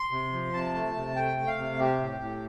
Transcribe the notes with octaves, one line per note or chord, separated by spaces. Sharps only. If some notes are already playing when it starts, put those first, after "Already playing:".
Already playing: C6
C3
F3
C3 A5
A3
C3
A3 G5
A3
F5
C3
C4 G4
A2
A2